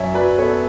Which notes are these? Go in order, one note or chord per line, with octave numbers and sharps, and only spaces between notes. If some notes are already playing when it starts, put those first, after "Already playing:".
Already playing: F#2 C#5 E5
F#3 B4 D5
B3 A4 C#5